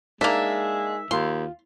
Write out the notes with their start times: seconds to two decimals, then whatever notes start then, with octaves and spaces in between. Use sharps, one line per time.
0.21 G#3 A#3 D4 D#4 A#4 E5
1.11 D#2 F4 C6